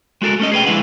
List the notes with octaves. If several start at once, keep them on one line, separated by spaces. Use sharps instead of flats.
G#3 F#4 A4 A#4
A3 C#4 D#5
G#4 B4 G5
D3 F3 G#3 E4 B4 F#5